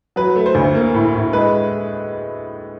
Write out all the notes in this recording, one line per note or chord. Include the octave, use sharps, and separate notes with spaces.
F#3 B4
A3
C5
D2
A#3
A2
A2
G#3 B4